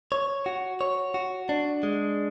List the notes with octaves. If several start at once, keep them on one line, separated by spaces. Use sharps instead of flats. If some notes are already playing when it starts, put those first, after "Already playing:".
C#5
F#4
C#5
F#4
D4
G#3